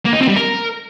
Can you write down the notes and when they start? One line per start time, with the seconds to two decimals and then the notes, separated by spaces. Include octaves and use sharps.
0.05 A#3
0.13 D#4
0.20 C4
0.28 G3
0.36 A#4